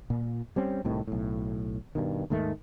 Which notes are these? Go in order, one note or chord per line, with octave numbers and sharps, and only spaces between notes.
A#2
G3 C4 C#4
C2 A2 C3 D#3
B1 A2
G2 B2 D#3
D#2 G#2 D#3 A3